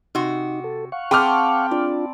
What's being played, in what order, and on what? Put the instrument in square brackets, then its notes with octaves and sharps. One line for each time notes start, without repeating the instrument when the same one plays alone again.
[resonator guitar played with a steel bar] C3 F#4 [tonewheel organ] D#4
[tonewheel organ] A4
F5 F#5 C#6
[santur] C4 A5 B5 [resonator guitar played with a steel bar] G#4 [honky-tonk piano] G5 D6 F6
[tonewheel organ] D4 F4 [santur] D5